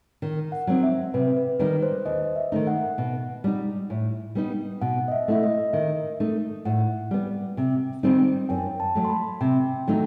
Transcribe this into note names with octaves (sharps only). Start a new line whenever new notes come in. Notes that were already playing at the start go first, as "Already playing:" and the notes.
D#3
F#5
F#3 C4 D#4
E5
C3 B4
B4
D#3 G3 D#4 B4
C5
D#2 D#5
E5
D#3 A3 D#4
F#5
B2
G3 D#4
A2
G3 B3 D#4
B2 F#5
D#5
E5
A3 E4 E5
D#5
D#3 E5
A3 D#4
A2 F#5
G3 B3
C3
D#3 G3 C4 D#4
F#2 G5
A5
F#3 A3
C6
B5
C3 G5
D#3 F#3 A3 D#4